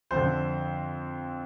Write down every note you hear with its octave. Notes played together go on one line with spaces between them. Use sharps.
F2 D3 C5